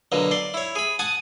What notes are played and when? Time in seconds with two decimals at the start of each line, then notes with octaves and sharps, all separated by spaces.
0.12 B2 D3 F#3 A#3
0.31 D5 C6
0.54 E4 C#5
0.76 G#4 B5
0.99 F#5 G#5 A5 D#6